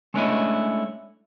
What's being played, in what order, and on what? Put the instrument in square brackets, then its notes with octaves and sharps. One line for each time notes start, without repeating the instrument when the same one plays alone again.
[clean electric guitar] G#3 A3 C#4 D4 E4 D#5